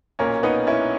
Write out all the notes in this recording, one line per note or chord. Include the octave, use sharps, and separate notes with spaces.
B1 A#2 A#3 C#4
B3 D#4
C#4 E4